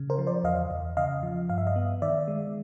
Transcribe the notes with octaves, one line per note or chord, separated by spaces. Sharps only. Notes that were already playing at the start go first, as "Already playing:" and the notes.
Already playing: C#3
A#4 C5
F3
C5 D5
E2 D#5 F5
E2
C#3 D#5 F5
F3
G2 F5
E5
D#5 F5
B3
D#3 D5 E5
G#3